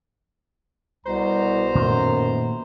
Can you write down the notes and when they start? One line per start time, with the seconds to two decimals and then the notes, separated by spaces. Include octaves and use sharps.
1.05 C2 B2 C5 A#5
1.75 F#2 A#2 D#3 A3